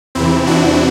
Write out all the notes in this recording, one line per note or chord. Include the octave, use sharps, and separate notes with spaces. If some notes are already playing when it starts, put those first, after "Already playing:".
E2 C3 E3 C4 E4
D4 F#4